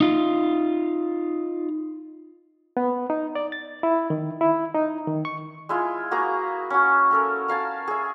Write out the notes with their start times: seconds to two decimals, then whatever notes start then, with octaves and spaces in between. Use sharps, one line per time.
0.01 D#4 F4
2.77 B3
3.10 D#4
3.35 D5
3.52 A6
3.83 E4
4.10 D#3
4.41 E4
4.74 D#4
5.08 D#3
5.25 C#6
5.69 G#3 E4 F4
6.11 A#3 F#4 G#4 A#5
6.70 C#4 F#4
7.11 C#4 A4 A#4
7.48 A#4 F5 G#5 A5
7.88 G#4 E5